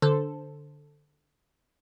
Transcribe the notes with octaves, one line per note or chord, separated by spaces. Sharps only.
D3 A4 C5